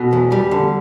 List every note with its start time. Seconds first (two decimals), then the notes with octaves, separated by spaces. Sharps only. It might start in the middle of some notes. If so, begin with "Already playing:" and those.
Already playing: B2 F#4 A4
0.13 E2
0.32 G3
0.51 D3